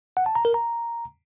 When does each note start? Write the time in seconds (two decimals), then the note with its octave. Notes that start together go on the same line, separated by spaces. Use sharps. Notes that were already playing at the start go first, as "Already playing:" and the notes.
0.17 F#5
0.26 A5
0.35 A#5
0.45 A#4
0.54 A#5